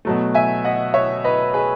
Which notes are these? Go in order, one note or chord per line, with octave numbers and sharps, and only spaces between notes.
B2 F#3 A3
E5 G#5
D#5 F#5
C#5 E5
B4 D#5
G#4 B4